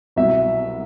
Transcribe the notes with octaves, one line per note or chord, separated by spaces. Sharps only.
C2 B2 F#3 E5